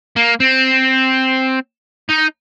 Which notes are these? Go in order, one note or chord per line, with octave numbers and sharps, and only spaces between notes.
A#3
C4
D#4